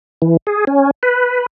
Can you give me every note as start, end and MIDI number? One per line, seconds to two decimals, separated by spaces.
0.22 0.37 52
0.47 0.65 68
0.67 0.91 61
1.03 1.46 71